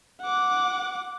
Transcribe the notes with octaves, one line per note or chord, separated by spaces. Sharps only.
F#5 D6